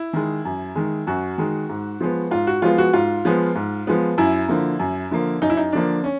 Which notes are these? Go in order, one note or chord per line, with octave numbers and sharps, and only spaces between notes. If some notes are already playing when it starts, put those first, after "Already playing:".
Already playing: E4
D#3 G#3
F#2
D#3 G#3
F#2 F#4
D#3 G#3
G#2
F3 G#3 B3
G#2 F4
F#4
F3 G#3 B3 F4
F#4
G#2 F4
F3 G#3 B3
G#2
F3 G#3 B3
F#2 E4
D3 F3 A#3
F#2
D3 F3 A#3
F#2 D#4
E4
D#4
D3 F3 A#3 D4
C#4